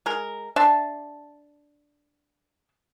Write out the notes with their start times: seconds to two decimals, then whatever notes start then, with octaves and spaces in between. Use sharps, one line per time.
0.06 G#3 A#4
0.56 D4 E5 A5 C6